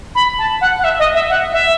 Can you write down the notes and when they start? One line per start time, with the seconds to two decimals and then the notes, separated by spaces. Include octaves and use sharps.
0.15 B5
0.38 A5
0.61 F#5
0.78 F#5
0.84 E5
0.99 D#5
1.14 E5
1.29 F#5
1.52 E5